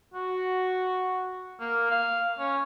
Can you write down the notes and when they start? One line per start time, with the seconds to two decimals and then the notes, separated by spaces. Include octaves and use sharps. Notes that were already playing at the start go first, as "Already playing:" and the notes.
0.14 F#4
1.60 A#3
1.91 F5
2.39 C#4